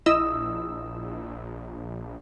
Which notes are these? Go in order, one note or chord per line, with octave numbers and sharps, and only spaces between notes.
A#1 E4 D#5 D#6 E6